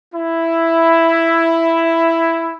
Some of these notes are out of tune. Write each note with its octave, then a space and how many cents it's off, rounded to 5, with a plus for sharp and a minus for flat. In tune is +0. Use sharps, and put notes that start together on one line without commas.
E4 +5